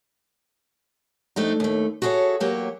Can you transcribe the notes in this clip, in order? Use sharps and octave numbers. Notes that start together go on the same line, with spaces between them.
F2 A3 D4 D#4
D#2 A3
F#4 G#4 A4 B4 C#5 E5
E2 F#3 A#3 G4 C#5